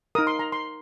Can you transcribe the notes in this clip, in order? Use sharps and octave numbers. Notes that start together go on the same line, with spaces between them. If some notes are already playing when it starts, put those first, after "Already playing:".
D#4 A#4 D#6
C6
A#5
C6